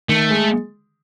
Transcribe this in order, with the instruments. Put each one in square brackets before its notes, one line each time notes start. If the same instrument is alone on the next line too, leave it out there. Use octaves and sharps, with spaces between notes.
[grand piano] D#3 [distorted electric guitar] A3
[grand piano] G#3